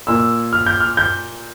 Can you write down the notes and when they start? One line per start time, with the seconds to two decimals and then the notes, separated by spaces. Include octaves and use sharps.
0.07 A#2 E6
0.53 F6
0.66 G6
0.80 F6
0.97 G6